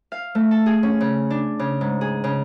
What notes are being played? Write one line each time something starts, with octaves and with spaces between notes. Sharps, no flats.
F5
A3
A5
G#4
C#4
C#3
D4
C#3
G#2
G#4
C#3